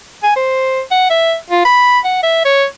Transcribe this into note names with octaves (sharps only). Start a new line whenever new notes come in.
G#5
C5
F#5
E5
F4
B5
F#5
E5
C#5